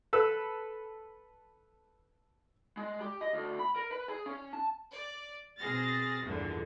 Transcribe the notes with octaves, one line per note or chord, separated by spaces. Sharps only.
A4 B4 E6
G#3
G4
D#5
D2
B5
A#4
B4
G#4
C#4
A5
D5
B2 C4 G#4 F6 A6 A#6
A1 E2 G2 A#2 D3 F3